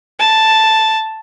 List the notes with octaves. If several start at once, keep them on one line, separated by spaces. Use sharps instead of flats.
A5